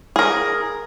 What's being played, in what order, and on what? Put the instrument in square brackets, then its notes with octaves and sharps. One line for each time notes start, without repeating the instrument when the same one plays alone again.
[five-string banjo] G#4 A#4